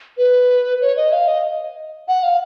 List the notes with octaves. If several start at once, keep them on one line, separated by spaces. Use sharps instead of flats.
B4
C#5
D#5
F5
D#5
F#5
F5